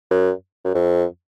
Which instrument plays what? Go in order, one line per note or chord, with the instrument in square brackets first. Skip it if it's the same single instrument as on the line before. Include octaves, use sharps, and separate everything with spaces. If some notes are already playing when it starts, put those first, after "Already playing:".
[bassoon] F#2
F#2
F2